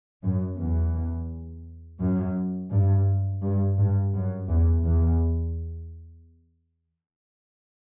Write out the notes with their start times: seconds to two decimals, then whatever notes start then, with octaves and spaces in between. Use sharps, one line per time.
0.22 F#2
0.58 E2
2.00 F#2
2.71 G2
3.42 G2
3.77 G2
4.13 F#2
4.48 E2
4.84 E2